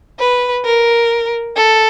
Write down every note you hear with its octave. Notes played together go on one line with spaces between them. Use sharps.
B4
A#4
A4